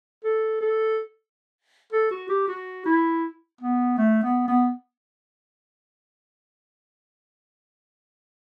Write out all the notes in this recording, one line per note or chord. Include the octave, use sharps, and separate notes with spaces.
A4
A4
A4
F#4
G4
F#4
E4
B3
A3
B3
B3